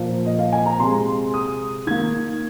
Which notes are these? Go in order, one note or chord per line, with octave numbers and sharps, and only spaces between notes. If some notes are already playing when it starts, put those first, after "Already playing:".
Already playing: A#2 F3 A#3
D#5
F5
G#5
A#5
C3 G#3 C6
D#6
D#3 A#3 G#6